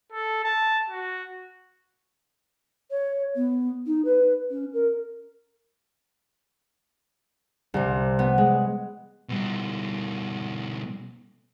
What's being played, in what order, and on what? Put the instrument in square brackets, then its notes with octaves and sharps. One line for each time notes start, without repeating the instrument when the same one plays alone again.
[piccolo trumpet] A4
A5
F#4
[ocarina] C#5
B3
D#4
B4
C#4
A#4
[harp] C2 C3
B3
G#3
[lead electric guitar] B2 G3